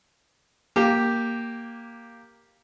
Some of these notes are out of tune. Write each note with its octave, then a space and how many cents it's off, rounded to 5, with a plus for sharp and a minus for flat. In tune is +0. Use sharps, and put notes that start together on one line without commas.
A#3 +0 G4 +0